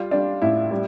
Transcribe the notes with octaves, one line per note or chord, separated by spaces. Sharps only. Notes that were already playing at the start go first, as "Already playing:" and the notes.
Already playing: G3 F4
G3 D4
A2 E4
G3